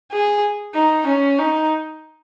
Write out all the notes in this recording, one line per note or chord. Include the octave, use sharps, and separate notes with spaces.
G#4
D#4
C#4
D#4